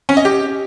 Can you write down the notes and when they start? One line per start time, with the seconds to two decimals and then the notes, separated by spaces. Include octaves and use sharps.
0.09 C#4
0.17 D#5
0.25 G4